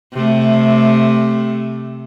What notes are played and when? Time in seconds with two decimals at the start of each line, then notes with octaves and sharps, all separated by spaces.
0.13 C3 A3